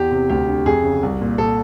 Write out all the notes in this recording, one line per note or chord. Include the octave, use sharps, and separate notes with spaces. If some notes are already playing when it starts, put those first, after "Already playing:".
Already playing: E2 G4
C3
D2 G4
D3
F2 G#4
C#3
C2
A#2
A#2 A4